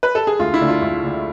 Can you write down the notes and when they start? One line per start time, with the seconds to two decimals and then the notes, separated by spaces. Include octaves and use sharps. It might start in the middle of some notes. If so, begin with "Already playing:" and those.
0.03 B4
0.15 A4
0.27 G#4
0.39 D2 F4
0.54 E4
0.61 D3 A3 D4
0.68 F4
0.82 D2
1.03 D3 A3 D4